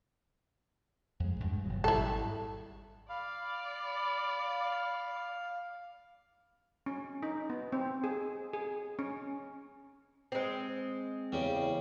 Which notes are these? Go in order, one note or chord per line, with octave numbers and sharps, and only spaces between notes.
F2 G#3
E2 G2 G#3
F#1 B2 F#3
G#1 G3 E4 A4
D5 F5 B5
C#4
D#4
B3
C4
G#4
G#4
C#4
G#3 C4
E2 C#3 G3